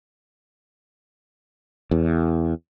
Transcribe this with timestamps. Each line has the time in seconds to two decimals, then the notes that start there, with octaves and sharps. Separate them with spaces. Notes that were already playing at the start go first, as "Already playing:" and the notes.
1.91 E2